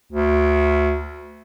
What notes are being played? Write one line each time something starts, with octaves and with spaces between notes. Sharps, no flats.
D2